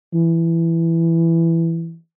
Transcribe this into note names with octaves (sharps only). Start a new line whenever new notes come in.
E3